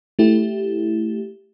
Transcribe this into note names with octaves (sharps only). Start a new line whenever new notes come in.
A3 E4 G4